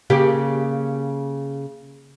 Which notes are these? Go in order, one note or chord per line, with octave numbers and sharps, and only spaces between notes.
C#3 A#3 G4